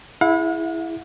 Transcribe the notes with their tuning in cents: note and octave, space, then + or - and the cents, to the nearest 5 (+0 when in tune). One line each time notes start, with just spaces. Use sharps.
E4 +0 G#4 +0 F#5 -45